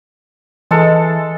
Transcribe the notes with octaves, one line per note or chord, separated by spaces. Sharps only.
E3 G#3 A4